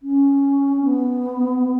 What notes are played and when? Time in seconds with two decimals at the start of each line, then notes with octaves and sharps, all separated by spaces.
0.03 C#4
0.84 B3